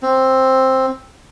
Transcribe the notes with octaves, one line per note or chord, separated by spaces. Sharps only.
C4